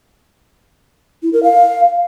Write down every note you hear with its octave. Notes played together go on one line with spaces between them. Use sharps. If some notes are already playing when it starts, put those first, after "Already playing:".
E4
A#4
F5